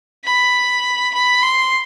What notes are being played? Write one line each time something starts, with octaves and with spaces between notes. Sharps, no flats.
B5
B5
C6